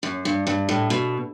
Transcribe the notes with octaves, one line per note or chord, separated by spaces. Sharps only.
F#2
G2
G2
A2
B2